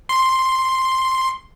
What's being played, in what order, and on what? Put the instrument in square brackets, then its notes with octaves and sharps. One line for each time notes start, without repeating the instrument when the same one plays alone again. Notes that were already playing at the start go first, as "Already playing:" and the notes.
[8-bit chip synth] C6